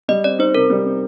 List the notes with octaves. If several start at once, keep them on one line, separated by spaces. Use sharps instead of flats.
G3 D#5
C4 D5
D#4 C5
C3 A#4
G3
C4